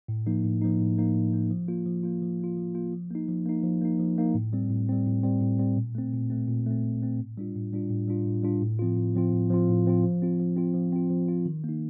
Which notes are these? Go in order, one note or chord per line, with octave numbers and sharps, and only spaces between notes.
A2
F3 A#3 D#4
A2
F3 A#3 D#4
A2
F3 A#3 D#4
A2
F3 A#3 D#4
F3
A#3 F4
F3
A#3 F4
F3
A#3 F4
F3
A#3 F4
F3
A#3 D#4
F3
A#3 D#4
F3
A#3 D#4
F3
A#3 D#4
A2
G3 C4
A2
G3 C4
A2
G3 C4
A2
G3 C4
A#2
A3 C4
A#2
A3 C4
A#2
A3 C4
A#2
A3 C4
A2
G3 D4 F4
A2
G3 D4 F4
A2
G3 D4 F4
A2
G3 D4 F4
A2
F3 C4 F4
A2
F3 C4 F4
A2
F3 C4 F4
A2
F3 C4 F4
F3
C4 F4
F3
C4 F4
F3
C4 F4
F3
C4 F4
D#3
A#3 D#4